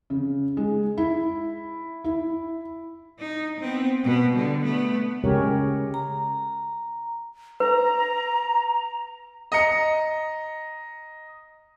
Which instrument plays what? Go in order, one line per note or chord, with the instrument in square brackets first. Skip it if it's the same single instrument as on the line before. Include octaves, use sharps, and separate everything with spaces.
[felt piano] C#3
G#3
E4
E4
[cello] D#4
B3 C4
B2 B3
D3 G3
A3 B3
[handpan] C#3 G#3 C#4 G4 A#4 C#5
[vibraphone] A#5
[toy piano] B4 [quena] A#5
[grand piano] D#5 A#5 C#7